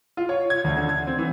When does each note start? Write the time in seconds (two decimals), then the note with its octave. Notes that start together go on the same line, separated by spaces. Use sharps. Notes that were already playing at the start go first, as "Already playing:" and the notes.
0.17 F4
0.29 C#5
0.50 G#6
0.64 D2
0.77 D3
0.89 G#6
1.07 C4
1.19 E3